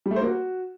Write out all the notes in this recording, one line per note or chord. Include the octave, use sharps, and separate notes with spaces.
G3
A3
C5
A#3
F#4